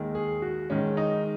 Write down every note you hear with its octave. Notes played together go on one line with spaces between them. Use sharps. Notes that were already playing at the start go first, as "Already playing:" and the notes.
Already playing: D#2 D#3 G#3
G#4
F#4
G#2 D#3 G#3 C#4
D#4